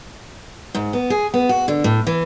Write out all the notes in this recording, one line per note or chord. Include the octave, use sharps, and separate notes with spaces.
G#2
B3
G#4
B3
F#4
D3
A2
E3